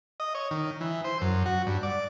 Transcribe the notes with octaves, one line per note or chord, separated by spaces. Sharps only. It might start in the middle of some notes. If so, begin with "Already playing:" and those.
D#5
C#5
D#3
E3
C5
F#2
F#4
G2
D5